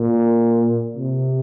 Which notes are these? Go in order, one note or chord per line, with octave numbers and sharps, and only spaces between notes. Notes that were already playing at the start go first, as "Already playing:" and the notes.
Already playing: A#2
C3